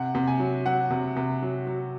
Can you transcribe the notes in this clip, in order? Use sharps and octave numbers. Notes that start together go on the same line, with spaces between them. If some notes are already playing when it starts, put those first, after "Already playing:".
Already playing: C3 F#5
C3
G#5
F#3
F#3 F#5
C3
C3
F#3
F#3